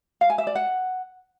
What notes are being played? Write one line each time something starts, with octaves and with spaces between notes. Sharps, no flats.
F5
G#5
E5
D5
F#5